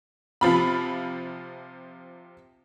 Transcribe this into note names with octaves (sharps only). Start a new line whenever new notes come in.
C3 F3 F4 B5